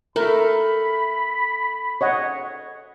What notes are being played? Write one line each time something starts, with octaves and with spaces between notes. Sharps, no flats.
A3 A#4 B5
C#5 D#5 F#5